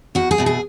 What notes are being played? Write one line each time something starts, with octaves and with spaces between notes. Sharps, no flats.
E2 F#4
G#4
B2 A3
G#4